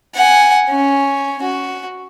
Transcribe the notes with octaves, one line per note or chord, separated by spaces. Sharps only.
F#5 G#5
C#4
F#4